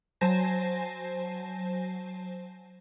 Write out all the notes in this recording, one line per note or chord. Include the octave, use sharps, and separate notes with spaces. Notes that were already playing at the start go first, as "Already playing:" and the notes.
F#3 C5 G#5 A5 A#6